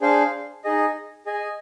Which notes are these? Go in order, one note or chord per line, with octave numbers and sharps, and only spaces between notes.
D4 G#4 C5 F5
D#4 G#4 D#5
G#4 D#5 G#5